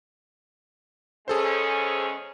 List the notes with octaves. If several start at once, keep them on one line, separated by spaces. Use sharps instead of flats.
E2 G#3 C#4 G#4 A4 C5